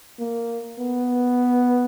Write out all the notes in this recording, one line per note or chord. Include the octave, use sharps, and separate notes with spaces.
A#3
B3